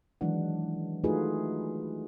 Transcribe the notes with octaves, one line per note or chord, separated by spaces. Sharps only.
D#3 E3 F#3 G#3 D4 F#5
A3 D#4 F4 F#4 G#4 B4